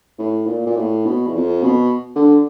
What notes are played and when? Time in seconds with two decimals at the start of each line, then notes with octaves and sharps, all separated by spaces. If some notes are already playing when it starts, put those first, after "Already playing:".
0.19 A2
0.47 A#2
0.66 A#2
0.76 A2
1.06 B2
1.26 E2
1.35 F2
1.63 B2
2.16 D3